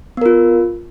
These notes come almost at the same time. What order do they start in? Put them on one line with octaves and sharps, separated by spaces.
B3 A#4 F4